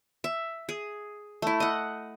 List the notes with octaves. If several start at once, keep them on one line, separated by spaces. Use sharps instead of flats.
E5
G#4
A3 E4
D#5 F#5